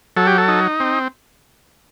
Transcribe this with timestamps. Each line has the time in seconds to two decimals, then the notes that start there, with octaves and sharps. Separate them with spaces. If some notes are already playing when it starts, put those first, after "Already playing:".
0.17 F#3 A4
0.27 G4
0.38 A4
0.48 D#4
0.80 C4